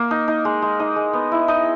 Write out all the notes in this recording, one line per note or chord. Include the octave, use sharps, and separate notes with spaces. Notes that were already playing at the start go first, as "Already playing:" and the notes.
Already playing: A#3
D#4
D#4
G#3
G#3
D#4 D#5
G#3
B3
E4
D#4 D#5